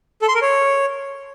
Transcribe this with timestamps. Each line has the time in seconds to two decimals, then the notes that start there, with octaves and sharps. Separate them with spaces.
0.22 A4
0.28 C6
0.35 A#4
0.42 C#5